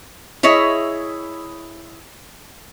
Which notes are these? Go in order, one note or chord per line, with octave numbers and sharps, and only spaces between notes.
E4 G#4 C#5 D#5 E5